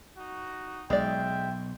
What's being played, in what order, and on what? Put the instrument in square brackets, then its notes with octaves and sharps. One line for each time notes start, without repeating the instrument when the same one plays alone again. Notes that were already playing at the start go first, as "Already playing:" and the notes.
[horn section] D#4 F#4
[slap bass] B1 [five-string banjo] G#3 D5 [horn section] E5 G5